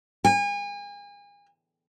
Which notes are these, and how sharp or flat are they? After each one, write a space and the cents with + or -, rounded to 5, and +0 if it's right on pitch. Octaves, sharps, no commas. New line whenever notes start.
G#5 -35